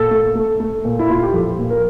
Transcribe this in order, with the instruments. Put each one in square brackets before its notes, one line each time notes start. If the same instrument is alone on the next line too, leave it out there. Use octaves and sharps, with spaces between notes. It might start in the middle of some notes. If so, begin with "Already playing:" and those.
Already playing: [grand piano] A#2 A4
A3
A3
A3
A#2
E4
A#2 F4
G4
F3 A4
A#2
A#4